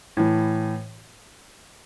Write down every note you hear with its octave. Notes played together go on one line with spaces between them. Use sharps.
A2 E3